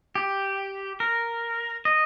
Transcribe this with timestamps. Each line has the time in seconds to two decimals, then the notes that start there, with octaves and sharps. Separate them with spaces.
0.15 G4
1.00 A#4
1.85 D#5